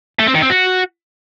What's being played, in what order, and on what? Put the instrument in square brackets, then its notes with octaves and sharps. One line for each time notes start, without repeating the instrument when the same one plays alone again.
[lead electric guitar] A3
C4
D#3
C4
F#4